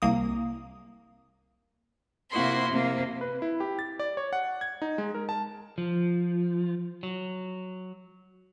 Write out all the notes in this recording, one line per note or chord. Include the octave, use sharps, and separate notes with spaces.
C2 A#3 D#6
C3 A#3 E4 F#4 C6
C3 A#3
B4
E4
G4
A6
D5
C#5
F#5
G#6
D#4
G#3
A#4
A5
F3
F#3